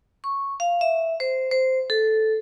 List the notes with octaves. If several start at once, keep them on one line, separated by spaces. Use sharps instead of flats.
C#6
F5
E5
C5
C5
A4